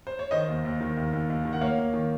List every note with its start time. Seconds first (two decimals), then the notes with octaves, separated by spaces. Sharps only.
0.07 C5
0.19 C#5
0.31 D#3 C5 D#5
0.48 D#2
0.65 D#2
0.81 D#3
0.97 D#2
1.13 D#2
1.30 D#2
1.45 D#3
1.53 F#5
1.61 A#3 C#5 F5
1.78 A#3
1.93 D#3